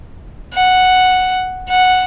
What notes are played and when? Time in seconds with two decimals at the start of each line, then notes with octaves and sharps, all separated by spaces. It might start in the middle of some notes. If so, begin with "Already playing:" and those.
0.53 F#5
1.68 F#5